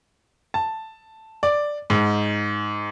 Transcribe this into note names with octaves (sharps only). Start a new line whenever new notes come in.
A5
D5
G#2